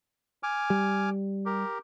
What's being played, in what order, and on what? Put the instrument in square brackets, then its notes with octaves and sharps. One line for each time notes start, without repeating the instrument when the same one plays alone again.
[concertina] G#5 D6 F6
[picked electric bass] G3
[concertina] G4 A#4